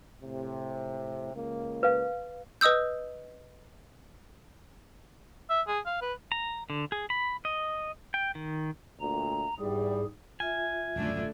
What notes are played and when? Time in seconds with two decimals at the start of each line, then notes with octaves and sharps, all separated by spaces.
0.23 A2 C3
1.35 C#2 A#3
1.83 B4 F5
2.61 B4 D#5 D#6 E6 G6
5.50 E5
5.68 G#4
5.86 F5
6.02 B4
6.32 A#5
6.70 D3
6.92 G#4
7.10 B5
7.45 D#5
8.14 G5
8.35 D#3
9.00 D2 A#2 A#5
9.59 E2 G#2 G3 G#4
10.40 F4 E5 G#5
10.96 D#1 F#2 D3 A3 D4